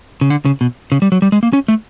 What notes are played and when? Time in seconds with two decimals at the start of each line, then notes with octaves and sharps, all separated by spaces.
0.21 C#3
0.30 D3
0.45 C#3
0.61 B2
0.92 C#3
1.02 G3
1.12 F#3
1.22 G3
1.32 G#3
1.43 A#3
1.53 C#4
1.68 A3